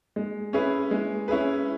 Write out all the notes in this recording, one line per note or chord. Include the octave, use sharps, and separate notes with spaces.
G#3
C#4 E4 G#4 B4
G#3
C#4 E4 G#4 B4